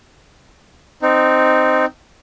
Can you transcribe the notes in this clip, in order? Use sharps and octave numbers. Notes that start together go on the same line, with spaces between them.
C4 D#4